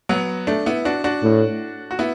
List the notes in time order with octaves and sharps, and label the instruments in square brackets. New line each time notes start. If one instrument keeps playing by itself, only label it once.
[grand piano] F#3 B3
A3 D4
B3 E4
D4 F#4
D4 F#4
[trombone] A2
[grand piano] F#4
B3 E4